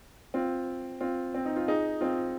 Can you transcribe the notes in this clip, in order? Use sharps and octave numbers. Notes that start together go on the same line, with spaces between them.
C4 F4
C4 F4
C4
D#4
F4
D#4 G#4
C4 F4